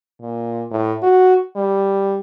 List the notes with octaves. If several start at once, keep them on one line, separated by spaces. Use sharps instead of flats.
A#2
A2
F#4
G3